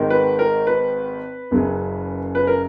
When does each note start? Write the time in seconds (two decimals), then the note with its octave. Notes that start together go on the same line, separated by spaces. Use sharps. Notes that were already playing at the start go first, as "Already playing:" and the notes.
Already playing: G#1 G#2 D#3
0.10 B4
0.39 A#4
0.67 B4
1.51 F#1 F#2 C#3
2.35 B4
2.47 A#4